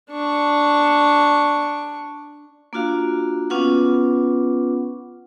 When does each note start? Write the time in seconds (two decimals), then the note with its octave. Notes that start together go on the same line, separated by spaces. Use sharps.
0.11 D4 C#6
2.73 A#3 D4 F4 F#4 F5
3.50 B3 C#4 F4 B4 F#5 D6